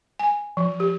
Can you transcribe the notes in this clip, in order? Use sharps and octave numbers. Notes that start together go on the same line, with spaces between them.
G#5
F3
G4